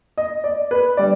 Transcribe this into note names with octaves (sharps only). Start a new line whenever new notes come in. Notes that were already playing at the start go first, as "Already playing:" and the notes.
D#5
D5
B4
D3 G3 D5